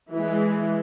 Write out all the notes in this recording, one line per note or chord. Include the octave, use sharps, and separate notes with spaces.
E3 G#3